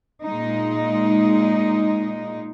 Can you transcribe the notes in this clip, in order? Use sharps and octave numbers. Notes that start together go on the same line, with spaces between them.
A#2 G#3 D#4